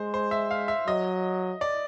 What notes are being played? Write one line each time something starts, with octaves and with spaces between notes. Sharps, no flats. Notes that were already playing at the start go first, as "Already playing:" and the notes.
Already playing: G#3 C5
C5
E5
F5
E5
F#3 D#5
D5